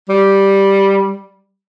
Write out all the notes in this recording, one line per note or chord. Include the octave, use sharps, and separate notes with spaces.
G3